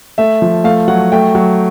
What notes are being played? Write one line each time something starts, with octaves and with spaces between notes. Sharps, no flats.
A3 E5
F3
A3 F5
F#3 F#5
A3 G5
F#3